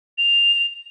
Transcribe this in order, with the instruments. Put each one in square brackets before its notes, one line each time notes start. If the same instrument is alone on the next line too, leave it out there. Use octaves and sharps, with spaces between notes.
[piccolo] F7